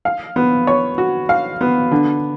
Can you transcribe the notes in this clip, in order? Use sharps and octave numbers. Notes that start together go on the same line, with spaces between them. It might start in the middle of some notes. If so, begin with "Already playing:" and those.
F5
B3
C#5
F#4
F5
B3
D3